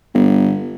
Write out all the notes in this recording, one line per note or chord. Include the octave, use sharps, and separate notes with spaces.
G1